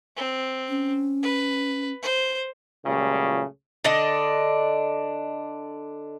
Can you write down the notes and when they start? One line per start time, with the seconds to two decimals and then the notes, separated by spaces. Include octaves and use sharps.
0.16 C4
0.69 C#4
1.22 B4
2.02 C5
2.84 C#2 A#2 C#3 F#3 G3 A3
3.84 D3 D4 D#5